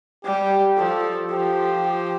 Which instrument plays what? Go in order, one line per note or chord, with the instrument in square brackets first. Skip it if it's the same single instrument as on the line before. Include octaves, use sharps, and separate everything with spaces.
[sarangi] G3 [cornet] G4
[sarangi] F3 [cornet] A4
[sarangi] F3 [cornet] G4
[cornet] G4